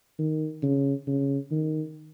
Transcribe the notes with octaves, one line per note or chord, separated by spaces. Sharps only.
D#3
C#3
C#3
D#3